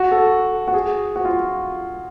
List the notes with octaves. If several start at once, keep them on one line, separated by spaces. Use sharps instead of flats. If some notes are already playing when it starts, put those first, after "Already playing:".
Already playing: F#4
A4
F#4
G#4
F#4
F4